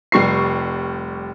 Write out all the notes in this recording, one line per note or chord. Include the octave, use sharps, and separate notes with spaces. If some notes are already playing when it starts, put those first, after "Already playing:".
F1 G3 C#6 C7